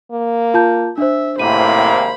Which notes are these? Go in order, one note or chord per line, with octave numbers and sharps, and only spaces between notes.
A#3
F4 A5 G6
D4 C5 E5
G#1 A2 C3 A#3 C5 B5 D#7